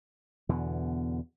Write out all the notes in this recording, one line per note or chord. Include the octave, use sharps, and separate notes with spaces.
E2 B2 D3